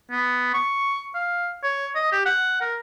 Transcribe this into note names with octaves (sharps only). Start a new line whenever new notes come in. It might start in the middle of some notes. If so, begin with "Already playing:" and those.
B3
C#6
F5
C#5
D#5
G4
F#5
A#4